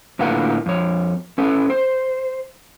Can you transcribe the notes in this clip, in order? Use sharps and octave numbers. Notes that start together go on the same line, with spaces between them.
A2 D3 A#3 F4 B4 F#5
F2 C#5
C#4 A4 B4
C5